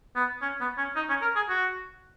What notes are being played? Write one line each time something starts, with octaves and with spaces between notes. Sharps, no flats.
B3
C#4
B3
C#4
D#4
C#4
A#4
G#4
F#4